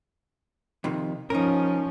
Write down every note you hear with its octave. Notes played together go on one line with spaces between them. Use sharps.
F2 C3 D#3
F3 C#4 D#4 A#4